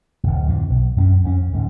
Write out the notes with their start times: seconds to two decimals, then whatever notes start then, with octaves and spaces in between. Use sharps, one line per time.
0.23 D1 G1
0.47 F2 A2 D3
0.70 B1
0.96 F#2 C4 C#4
1.24 F2 C#4
1.53 D1 G#2